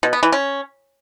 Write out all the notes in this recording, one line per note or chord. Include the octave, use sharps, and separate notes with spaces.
B2
B3
E3
C#4